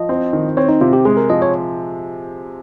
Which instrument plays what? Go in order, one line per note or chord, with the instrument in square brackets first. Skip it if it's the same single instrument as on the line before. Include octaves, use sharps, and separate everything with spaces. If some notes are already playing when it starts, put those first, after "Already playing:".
Already playing: [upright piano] F3 [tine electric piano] D#5
[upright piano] C4
D#3
[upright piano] C4 [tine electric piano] C#5
[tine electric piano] D#4
[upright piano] C3 [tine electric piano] F4
[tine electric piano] G4
[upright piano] G#3 [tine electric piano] G#4
[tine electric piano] A#4
[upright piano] F3 [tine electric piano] D#5
[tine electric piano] C#5